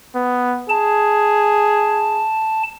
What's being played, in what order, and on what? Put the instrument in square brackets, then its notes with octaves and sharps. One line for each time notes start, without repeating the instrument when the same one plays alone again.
[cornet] B3
[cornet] G#4 [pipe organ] A5